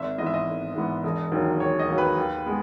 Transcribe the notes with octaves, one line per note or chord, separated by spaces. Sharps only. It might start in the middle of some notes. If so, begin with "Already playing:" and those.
Already playing: G#1 E5
G#2 E3 B3 D#5
E5
D#5
G#1
G#2 E3 B3
E1
D#2 D#3 F#3
E1 C#5
D#5
D#2 D#3 F#3
B4
D#2
G#3 B3